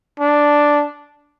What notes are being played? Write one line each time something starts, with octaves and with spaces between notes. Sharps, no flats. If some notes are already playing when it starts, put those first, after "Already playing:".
D4